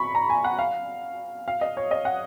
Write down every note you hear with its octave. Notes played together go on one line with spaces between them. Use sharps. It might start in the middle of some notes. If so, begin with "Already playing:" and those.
Already playing: B5 C#6
A#5
G#5
F#5
F5
F5
D#5
C#5
D#5
F#5